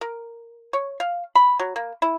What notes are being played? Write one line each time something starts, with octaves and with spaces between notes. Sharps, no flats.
A#4
C#5
F5
B5
F#3
A#3
E4